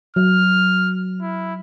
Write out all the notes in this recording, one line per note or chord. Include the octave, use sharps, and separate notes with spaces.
F#3 F6
E4